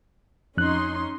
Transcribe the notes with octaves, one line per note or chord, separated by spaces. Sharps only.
F2 C#4 D#4 C6 F#6